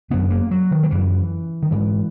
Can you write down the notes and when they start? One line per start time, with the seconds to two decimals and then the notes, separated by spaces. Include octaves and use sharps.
0.10 F#2 C#3 B3
0.30 A#3
0.51 F#3
0.71 D#3
0.83 F#3
0.91 F#2 C#3 E3
1.63 D#3
1.71 G#2 E3